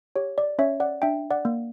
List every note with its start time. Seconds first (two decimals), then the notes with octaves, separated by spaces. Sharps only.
0.16 G4 C#5
0.38 D5
0.59 C#4 C#5 E5
0.80 D5 F#5
1.02 D4 E5 G5
1.31 D5 F#5
1.45 A#3